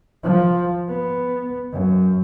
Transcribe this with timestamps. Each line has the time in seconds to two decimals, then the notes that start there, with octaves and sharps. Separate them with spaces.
0.23 F3
0.89 B3
1.73 F#2